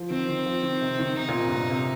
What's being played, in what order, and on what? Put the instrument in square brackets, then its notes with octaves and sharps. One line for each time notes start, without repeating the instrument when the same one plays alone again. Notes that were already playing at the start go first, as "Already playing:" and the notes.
Already playing: [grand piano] F3
[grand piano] D#3 [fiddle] C4
[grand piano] D#3
F3
D#3
C3
D#3
[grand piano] C3 [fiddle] D#4
[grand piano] A#2
C3
G2
A#2
C3